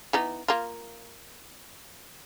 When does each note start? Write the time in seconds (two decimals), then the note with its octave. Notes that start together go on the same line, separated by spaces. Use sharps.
0.13 E3 B3 D#4
0.48 A#3 F4